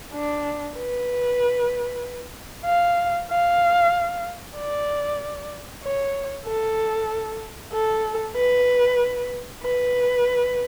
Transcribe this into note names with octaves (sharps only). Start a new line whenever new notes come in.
D4
B4
F5
F5
D5
C#5
A4
A4
B4
B4